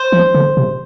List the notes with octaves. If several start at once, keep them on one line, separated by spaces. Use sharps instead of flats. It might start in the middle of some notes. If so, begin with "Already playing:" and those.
Already playing: C5
F3
D3
C3